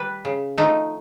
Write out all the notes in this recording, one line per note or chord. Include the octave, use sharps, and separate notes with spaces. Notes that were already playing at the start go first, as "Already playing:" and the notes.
Already playing: G3 B4
C#3
F3 A3 D#4